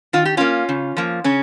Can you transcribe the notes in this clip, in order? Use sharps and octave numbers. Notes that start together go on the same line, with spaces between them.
D#3 F4
G4
A#3 C#4 F4
C#3
F3 A#3
C#3 C#4